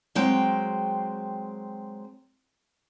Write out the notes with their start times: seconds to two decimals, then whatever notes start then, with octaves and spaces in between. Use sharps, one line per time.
0.15 F#3 G#3 C4 G5